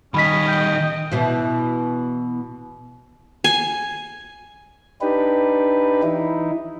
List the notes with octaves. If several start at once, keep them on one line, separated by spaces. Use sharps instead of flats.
D#3 G3 C#4 D#5 B5 B6
G5
B2 E3
G#5
D4 D#4 G4 B4
E3 D#4 E4